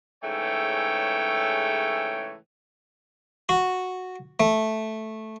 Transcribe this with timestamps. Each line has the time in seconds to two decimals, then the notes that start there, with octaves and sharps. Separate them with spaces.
0.23 G#2 C#3 E3 A3 C#5 G5
3.49 F#4
4.40 A3